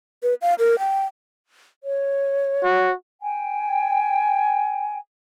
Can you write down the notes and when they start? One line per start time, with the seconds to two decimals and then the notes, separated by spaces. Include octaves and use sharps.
0.23 B4
0.42 F5
0.59 A#4
0.79 G5
1.84 C#5
2.64 F#4
3.22 G5 G#5